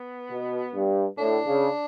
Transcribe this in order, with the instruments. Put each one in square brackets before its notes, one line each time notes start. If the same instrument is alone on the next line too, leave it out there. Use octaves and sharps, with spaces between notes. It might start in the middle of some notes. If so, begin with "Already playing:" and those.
Already playing: [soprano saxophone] B3
[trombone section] B2
G2
[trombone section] A2 [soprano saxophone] D4
[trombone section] C#3